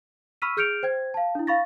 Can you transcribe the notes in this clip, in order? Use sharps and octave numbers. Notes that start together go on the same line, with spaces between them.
B5 C#6 E6 F6 B6 D#7
G#4 F6 G6 C#7 D7 F7
C5 G5 G#6
F5 A5
D4 E4
F5 B5 C#6 A6 A#6